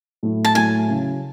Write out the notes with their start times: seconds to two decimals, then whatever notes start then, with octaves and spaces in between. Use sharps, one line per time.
0.23 A2 F#3 A3 E4
0.45 A5
0.55 A2 F#3 A3 E4 G#5
0.87 C#3 F#3 C#4 E4